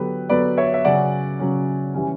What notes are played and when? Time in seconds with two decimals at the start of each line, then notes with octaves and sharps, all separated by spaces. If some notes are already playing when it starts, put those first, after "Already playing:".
Already playing: D3 F#3 B3 G4 B4
0.29 D3 F#3 B3 B4 D5
0.57 C#5 E5
0.74 E5
0.84 C#3 F#3 C#4 D5 F#5
1.39 C#3 F#3 C#4
1.94 E3 G3 C#4